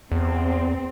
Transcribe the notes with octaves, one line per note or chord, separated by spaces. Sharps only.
E2 C4